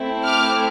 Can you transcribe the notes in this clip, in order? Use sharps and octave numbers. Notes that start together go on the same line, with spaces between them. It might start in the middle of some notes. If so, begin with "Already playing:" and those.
Already playing: A3 C4 E4
D6 F6